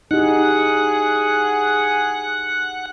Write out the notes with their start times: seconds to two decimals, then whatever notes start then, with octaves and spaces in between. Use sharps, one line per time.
0.11 D#4 E4 G4 G#4 F#5